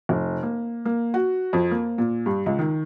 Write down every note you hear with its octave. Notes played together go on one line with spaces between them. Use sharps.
F1
A#3
A#3
F#4
F2
A#3
A#2
G2
C#2
D#3